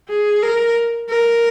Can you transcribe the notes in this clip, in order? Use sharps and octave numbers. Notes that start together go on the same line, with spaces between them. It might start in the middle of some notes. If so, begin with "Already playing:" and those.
G#4
A#4
A#4